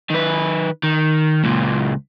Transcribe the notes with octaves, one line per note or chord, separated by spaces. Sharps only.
D#3 B4
D#3
C#2 A#2